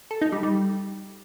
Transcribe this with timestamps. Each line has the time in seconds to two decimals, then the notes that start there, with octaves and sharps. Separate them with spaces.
0.11 A4
0.22 D#4
0.32 G3
0.43 G3